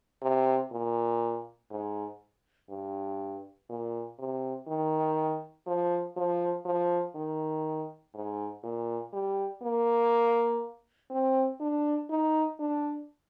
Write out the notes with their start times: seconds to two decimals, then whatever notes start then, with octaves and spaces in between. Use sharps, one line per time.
0.22 C3
0.71 A#2
1.70 G#2
2.69 G2
3.69 A#2
4.19 C3
4.68 D#3
5.67 F3
6.16 F3
6.65 F3
7.15 D#3
8.14 G#2
8.63 A#2
9.13 G3
9.63 A#3
11.11 C4
11.60 D4
12.10 D#4
12.60 D4